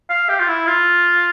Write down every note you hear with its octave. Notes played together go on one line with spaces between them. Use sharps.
F5
G4
F4
E4
F4